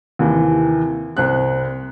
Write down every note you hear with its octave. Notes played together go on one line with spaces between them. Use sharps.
D#2 C3 E3
C2 C4 F#6